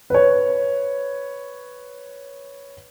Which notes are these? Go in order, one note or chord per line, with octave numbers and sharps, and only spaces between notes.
B4 C#5